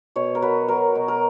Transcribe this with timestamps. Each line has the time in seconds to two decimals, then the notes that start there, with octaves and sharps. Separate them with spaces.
0.16 B2 C#5
0.35 A#4
0.42 F#3 B4
0.68 F#3 A#4
0.95 B2
1.08 A#4